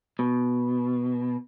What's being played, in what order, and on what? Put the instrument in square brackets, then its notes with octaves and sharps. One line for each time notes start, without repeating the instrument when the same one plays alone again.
[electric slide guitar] B2